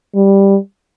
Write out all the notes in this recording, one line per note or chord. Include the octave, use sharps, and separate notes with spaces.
G3